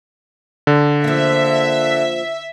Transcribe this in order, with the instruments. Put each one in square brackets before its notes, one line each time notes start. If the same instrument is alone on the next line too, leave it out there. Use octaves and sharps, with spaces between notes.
[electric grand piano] D3
[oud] F3 A#3 [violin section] E5